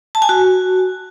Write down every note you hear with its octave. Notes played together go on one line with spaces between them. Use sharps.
A5
G#5
F#4